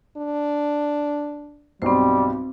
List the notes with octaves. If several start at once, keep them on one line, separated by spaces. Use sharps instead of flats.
D4
B1 G2 G3 C4 C5